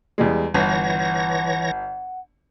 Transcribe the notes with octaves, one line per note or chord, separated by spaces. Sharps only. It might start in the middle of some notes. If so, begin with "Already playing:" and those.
E2 G3 G#3
G1 E3 C#5 F#5 A#6